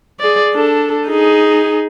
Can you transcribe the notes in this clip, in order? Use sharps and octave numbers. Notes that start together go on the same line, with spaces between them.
G#4 D5
D4 A4
D#4 G#4